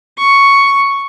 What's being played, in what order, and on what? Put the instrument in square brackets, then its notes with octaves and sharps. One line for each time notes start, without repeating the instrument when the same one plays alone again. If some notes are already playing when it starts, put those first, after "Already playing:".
[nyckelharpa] C#6